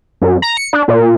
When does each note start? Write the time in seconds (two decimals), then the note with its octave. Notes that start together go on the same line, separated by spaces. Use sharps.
0.22 F#2
0.42 A#5
0.57 C#7
0.73 D4
0.88 A#2